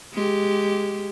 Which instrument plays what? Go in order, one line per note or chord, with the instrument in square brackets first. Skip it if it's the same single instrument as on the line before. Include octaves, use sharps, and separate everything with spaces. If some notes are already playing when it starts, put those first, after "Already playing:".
[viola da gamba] G#3 G4